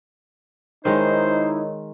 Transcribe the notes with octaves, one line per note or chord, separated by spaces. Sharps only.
D#3 G#3 D#4 E4 A#4 C5 C#5 D#5